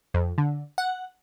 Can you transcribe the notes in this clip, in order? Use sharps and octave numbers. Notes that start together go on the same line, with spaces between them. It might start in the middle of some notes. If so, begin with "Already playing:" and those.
F2
D3
F#5